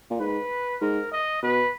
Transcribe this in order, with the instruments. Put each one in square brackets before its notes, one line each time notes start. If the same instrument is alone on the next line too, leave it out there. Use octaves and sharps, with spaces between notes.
[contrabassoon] A#2
[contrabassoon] G#2 [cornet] B4
[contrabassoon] G#2 [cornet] A#4
[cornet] D#5
[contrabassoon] B2 [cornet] B4